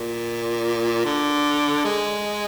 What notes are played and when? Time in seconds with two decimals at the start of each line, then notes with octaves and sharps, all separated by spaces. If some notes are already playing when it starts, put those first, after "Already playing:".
Already playing: A#2
1.05 D3
1.84 G#3